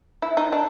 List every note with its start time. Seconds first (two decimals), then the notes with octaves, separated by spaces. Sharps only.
0.22 E4
0.37 D#4
0.52 D4